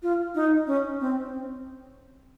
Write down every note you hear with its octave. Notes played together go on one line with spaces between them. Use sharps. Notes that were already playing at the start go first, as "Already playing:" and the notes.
F4
D#4
C#4
C4